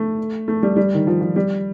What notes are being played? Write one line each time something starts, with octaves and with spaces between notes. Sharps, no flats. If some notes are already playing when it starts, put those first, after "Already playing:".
Already playing: A3
A3
G3
G3
D#3
F3
F3
G3